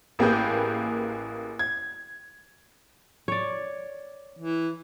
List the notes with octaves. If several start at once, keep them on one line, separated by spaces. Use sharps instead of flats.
A1 A#3 G4 G#4 B4 G6
G#6
C#5 D5
E3